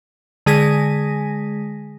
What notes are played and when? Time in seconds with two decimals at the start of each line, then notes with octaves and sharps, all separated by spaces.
0.46 D3 G#3 G#4 G#5 A#6 B6